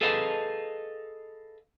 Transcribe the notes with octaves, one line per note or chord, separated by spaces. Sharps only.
G#4 A4 B4 D#5 F5 A5